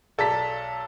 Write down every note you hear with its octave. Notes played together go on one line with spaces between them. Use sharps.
B1 A4 D5 A5 A#5 B6